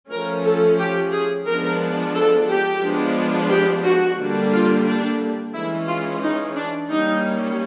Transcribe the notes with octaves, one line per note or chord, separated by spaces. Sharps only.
F3 A3 C#4 A#4
A4
G4
G#4
F3 G#3 B3 D4 A#4
A4
G4
F3 G#3 B3 D4
G4
F#4
D3 G3 A#3 D4
F4
D4
E3 G#3 C#4 E4
F4
D#4
D4
G3 A#3 C#4 D#4